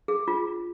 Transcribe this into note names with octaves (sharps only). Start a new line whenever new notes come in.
G#4
F4